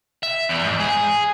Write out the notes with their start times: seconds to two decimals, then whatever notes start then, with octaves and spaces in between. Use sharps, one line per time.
0.23 E5
0.49 E2
0.64 G#2
0.80 G#4